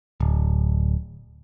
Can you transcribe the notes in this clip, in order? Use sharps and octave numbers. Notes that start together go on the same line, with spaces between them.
D1